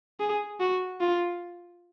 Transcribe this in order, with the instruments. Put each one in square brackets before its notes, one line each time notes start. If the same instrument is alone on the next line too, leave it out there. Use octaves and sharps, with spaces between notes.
[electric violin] G#4
F#4
F4